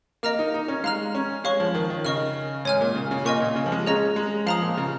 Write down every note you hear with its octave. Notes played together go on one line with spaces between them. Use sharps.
A#3 D#5 A#5 F6
D#4
D#4
C#4
G#3 F5 A#5 F6
C#4
G#3 C#5 F5 C#6
F3
D#3
D#3
C#3 D#5 C#6 F6
G#2 C#5 G#5 F6
A#2
C#3
C#3
A#2 D#5 G#5 C#6
A#2
C#3
F3
G#3
C#4 G#4 D#5 A#5
G#3
F3 F5 A#5 D#6
A#2
C#3